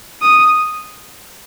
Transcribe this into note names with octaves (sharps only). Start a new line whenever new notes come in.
D#6